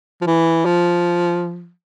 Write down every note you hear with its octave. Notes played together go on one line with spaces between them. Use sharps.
F3
E3
F3